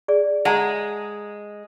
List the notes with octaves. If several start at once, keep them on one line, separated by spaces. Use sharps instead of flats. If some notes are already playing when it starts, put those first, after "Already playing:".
G#4 D5
G#3 F#5 A5 A#5